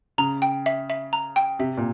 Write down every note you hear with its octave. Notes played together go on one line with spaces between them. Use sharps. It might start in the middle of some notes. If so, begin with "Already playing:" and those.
C#3 A#5
G5
E5
E5
A#5
G5
C3 E5
A#2